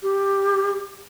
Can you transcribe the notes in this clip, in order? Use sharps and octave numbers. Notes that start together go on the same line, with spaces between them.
G4